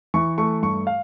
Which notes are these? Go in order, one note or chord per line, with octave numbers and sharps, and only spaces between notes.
E3 C#6
A3 C#6
G2 C#6
F5